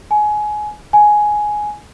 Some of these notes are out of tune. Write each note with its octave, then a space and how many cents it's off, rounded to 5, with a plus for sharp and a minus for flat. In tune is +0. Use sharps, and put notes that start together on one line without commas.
G#5 +20
G#5 +10